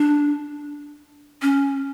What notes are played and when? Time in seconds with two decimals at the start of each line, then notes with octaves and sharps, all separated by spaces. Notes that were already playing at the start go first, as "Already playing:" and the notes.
Already playing: D4
1.42 C#4